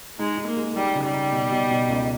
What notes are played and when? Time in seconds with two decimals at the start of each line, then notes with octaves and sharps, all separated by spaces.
0.19 G#3 D#4
0.37 D#4
0.47 A#3
0.57 G#3
0.76 G3 D#4
0.95 C#3
1.03 G3
1.13 D#4
1.33 B2
1.52 B2
1.70 B2
1.89 C#2